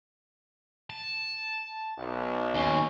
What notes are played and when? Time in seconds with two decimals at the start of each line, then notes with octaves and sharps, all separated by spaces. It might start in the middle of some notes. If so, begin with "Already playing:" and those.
0.90 A5
1.98 B1
2.55 D#2 C#4